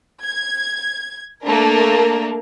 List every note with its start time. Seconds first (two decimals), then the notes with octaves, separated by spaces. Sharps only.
0.24 G#6
1.45 A3 A#3 D4 A#4